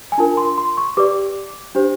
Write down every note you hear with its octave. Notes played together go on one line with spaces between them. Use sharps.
G#5
D4 F4 A#4 A5
C6
C6
C#6
G4 B4 D5 D6
D4 G4 C5